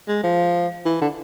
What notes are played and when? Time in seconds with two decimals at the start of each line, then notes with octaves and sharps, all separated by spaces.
0.08 G#3
0.24 F3
0.86 E3
1.01 D3